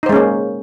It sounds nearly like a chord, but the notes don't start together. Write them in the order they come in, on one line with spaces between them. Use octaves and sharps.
D#4 C5 G#3 C#4 A#3